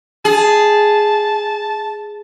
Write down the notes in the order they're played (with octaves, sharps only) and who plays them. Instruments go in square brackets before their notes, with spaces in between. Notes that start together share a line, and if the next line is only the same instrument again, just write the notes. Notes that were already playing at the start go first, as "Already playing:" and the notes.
[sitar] G#4 [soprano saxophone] A5